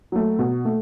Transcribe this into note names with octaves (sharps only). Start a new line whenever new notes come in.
F#3 A3
B2
A3